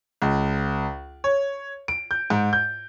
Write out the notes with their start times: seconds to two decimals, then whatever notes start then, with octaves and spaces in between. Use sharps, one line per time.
0.22 C#2
1.24 C#5
1.88 D7
2.11 G6
2.30 G#2
2.53 G6